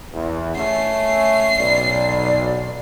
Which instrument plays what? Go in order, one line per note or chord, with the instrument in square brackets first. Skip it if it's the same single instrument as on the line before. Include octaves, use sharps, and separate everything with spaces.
[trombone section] E2
[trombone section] A3 C#4 [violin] C7
[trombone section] B1 [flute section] D5